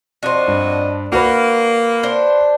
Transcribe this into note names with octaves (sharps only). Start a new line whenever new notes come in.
F2 D4 F#4 C5 D#5
G2
A#3 F#4 B4
D4 C5